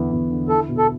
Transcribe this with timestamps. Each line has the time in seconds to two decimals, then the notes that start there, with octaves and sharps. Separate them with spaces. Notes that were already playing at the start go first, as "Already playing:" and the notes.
Already playing: E2 D3 B3 E4
0.12 E2
0.31 D3
0.49 E4 A4
0.69 B2
0.78 A4